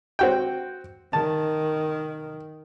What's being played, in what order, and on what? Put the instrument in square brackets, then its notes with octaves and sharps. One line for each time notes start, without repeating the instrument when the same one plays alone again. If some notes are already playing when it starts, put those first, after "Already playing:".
[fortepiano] C4 F#4 G5
[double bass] D#3 [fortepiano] A5